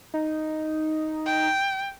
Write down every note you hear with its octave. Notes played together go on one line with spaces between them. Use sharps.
D#4
G5